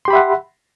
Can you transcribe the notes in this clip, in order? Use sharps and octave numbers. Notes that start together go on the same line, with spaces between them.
G4 E5 F#5 B5 C6